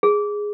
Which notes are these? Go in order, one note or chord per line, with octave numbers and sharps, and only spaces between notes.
G#4